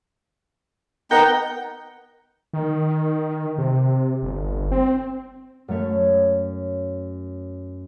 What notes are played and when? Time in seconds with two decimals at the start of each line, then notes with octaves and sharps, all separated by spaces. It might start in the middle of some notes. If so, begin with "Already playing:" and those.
1.11 B3 D#4 A#4 F#5 G5
2.53 D#3
3.58 C3
4.23 G1
4.71 C4
5.68 F#2 F#3 A3 C#5 B6